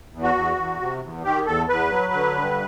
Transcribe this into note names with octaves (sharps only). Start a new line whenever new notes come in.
E2
F#4
E2
E2
C3
E2
D#3 G4
E2 A4
E2 B4
F#3
D3
G2